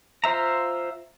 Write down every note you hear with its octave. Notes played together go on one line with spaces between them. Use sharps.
F4 C5 E5 A#5